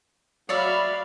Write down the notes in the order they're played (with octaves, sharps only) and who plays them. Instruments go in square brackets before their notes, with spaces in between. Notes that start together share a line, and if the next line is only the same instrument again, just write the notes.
[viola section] F#3 F5 B5 [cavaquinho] C#5 D5 E5